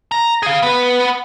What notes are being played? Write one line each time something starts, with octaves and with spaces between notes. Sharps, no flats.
A#5
G#4 F5
B3 B4